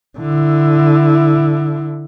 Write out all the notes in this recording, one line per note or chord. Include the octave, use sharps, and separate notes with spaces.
D3 E4